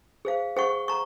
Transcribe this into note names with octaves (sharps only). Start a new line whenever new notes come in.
G#4 C5 F5
G#4 C5 F#5 C#6
A#5 C#6